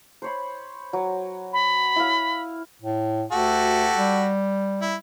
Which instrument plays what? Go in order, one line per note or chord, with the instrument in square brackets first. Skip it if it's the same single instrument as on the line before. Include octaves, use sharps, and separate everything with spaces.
[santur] C5 C#5 B5
F#3
[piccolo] B5
[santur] E4 F5
[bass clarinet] A2
[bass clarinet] D2 [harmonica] F#4 G4 A4
[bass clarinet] G3
[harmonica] E4